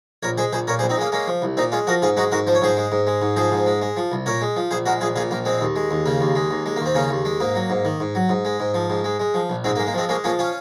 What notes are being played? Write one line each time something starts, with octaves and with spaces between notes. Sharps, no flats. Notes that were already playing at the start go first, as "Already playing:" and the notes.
A#1 A#4 C#5
G#3 G#4 C5
A#1 G#4 C5
A#2 A#4 C#5
G#4 C5
A#1
C4 D#4
G#3 A#3 C#4
G#3 A#3 C#4
F3
C2
A#2 C4 D#4
G#3 C#4 F4
F3 F#4 A#4
G#2 F4 G#4
G#3 D#4 F#4
G#2 F#4 A#4
F3 C5
C#5
G#2 G#4 C5
G#3
G#2
G#3
G#2
F3 G#4 C5
G#2
G#3
G#3
F3
C2
A#2 A#4 C#5
G#3
F3
A#1 G#4 C5
G#3 F#4 A#4
A#1 F4 G#4
A#2 F4 G#4
A#1 A#3
G#3 C4
D#2
G#3
D#2
C#3 A#3
D#2
G#3
D#2
G#3
D#2 A#3
C4
C#3 A#3 C#4
D#2
G#3
G#2 A#3
F#3
G#2
D#3
G#2
F#3
G#2
G#3
G#2
F3
G#2
G#3
G#3
F3
A#1
G#2 G#3 C4
A#3
G#3
A#3
F3 G#3 C4
G#3 A#3 C#4
F3 A#3 C#4
C#4 F4